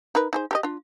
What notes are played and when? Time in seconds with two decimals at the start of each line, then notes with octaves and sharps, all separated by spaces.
0.15 D#4 A#4 B4
0.33 D#4 G#4 C5
0.51 G4 A#4 D#5
0.63 D4 F4